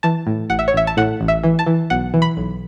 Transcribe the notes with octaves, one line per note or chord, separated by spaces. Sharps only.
E3 A5
A2
A1 F#5
E5
C#5
A1 E5
A5
A2 F#5
A1
E5
E3
A5
E3
B1 F#5
E3
B5
B1